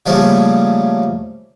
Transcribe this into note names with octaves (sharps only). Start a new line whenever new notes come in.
C#3 F3 G3 A3 A#3 C#4